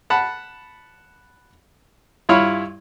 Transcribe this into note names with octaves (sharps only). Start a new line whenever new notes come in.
F#5 A5 B5
G2 E4 F4 C#5 F5 B5